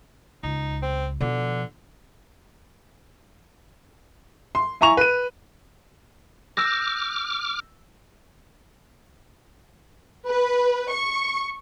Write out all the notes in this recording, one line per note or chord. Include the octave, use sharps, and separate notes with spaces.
C#2 D#4
C4
B2 D3 F3
C6
E4 G#5 A#5 C#6 F7
B4 D#7
D6 E6 F6 G6 A#6
B4
C#6